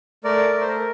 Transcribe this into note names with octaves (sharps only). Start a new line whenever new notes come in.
A3 A#4 D5
A3
C5
A#4